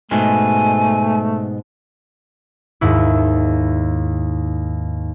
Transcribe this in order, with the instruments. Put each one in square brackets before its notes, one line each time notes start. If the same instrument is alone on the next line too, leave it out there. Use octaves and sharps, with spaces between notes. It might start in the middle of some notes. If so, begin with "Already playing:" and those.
[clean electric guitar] G#2 B2 G#3 [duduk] A3 [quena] G#5
[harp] D#2 G#2 E4